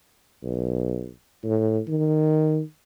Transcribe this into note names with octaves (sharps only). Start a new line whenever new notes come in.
B1
A2
D#3